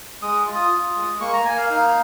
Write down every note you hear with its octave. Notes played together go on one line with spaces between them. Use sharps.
G#3 D#6
F4
D#6
F4
G#3
A#3 C#6
A#5
A#3 G#5
F5
D#4 F5